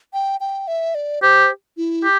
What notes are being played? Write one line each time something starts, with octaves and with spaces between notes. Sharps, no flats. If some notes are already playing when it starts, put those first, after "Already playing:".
G5
G5
E5
D5
G4 C5
E4
G4